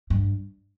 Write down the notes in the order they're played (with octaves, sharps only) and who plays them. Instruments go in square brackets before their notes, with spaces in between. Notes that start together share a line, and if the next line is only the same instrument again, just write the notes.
[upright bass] G2